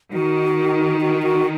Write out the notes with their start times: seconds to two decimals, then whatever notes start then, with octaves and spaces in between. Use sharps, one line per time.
0.13 D#3 F#4
1.01 F#4
1.23 F#4